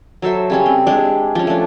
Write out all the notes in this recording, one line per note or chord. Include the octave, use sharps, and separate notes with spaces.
F#3 A4 C5 E5
C#3 G3 C#4
C4
G#3 D4 G4
F3 C#4
A3 D4